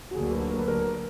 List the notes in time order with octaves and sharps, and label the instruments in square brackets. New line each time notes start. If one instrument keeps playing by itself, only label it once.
[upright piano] F#4
[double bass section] D2 D3 F#3 A#3 [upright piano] G#4
[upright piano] B4
A#4
B4
A#4